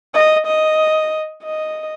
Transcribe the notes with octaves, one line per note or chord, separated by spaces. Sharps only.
D#5
D#5
D#5